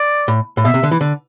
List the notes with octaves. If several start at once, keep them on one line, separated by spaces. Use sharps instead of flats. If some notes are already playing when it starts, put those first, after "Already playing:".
Already playing: D5
A2
A2
B2 E5
C3
D3
E3
D3